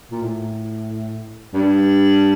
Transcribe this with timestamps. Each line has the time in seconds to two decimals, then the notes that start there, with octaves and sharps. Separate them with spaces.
0.11 A#2
0.22 A2
1.54 G2